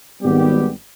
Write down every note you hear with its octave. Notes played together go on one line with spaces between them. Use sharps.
G#1 G3 B3 G4